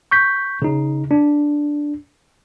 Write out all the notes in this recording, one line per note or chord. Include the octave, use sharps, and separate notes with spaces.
C#6 G6 B6
C#3 D#4
D4